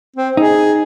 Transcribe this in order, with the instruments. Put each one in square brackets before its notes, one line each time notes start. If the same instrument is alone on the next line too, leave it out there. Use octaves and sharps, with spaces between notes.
[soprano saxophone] C4
[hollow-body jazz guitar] D#4 [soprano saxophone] G#4